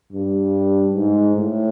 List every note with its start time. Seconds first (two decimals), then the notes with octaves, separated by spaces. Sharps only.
0.13 G2
0.94 G#2
1.36 A2